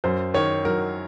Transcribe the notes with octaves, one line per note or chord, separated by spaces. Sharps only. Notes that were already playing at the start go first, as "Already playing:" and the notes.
F#2 C5
D#3 C#5
F#3 A#4